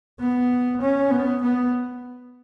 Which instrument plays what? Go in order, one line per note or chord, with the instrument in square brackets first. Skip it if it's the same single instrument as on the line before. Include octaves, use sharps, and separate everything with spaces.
[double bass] B3
C#4
B3
B3